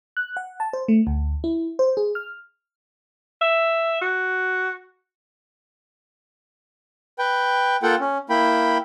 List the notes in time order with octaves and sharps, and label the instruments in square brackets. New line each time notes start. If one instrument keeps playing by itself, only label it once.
[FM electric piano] F#6
F#5
A5
C5
A3
D2
E4
C5
G#4
F6
[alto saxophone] E5
F#4
[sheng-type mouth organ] B4 G5
A#3 F4 A4 F#5 G5
C#4
A#3 E4 G5 B5